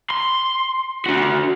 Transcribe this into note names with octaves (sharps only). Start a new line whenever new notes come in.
C6
D4 F#4